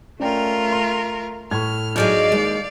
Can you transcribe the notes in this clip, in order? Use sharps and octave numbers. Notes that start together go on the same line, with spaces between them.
A3 C#4 F4 A#4 D5 G5
C6
A2 C#6 F6 G#6
G#2 F#3 G#3 G#4 D5 F5 F6 G6
D#2 G#3